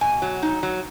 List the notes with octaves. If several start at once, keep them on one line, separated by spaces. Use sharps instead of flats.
B2 G#5
F#3
D#4
F#3